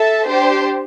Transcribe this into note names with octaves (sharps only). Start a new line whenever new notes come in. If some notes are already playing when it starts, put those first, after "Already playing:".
Already playing: A4 E5 A5
D4 G4 C5